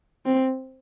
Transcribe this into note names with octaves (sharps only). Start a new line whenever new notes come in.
C4